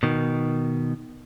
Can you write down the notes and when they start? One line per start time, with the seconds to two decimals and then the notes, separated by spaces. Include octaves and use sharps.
0.03 B2 D#3